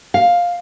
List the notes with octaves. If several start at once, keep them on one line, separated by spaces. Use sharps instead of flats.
F5